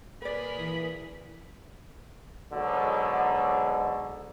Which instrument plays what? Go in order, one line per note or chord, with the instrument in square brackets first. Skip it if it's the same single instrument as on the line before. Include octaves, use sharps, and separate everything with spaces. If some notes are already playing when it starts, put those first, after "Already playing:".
[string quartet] A#2 G#4 A#4 [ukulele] B4 D5 [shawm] B5
[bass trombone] E3
[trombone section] G#2 B2 D3 F#3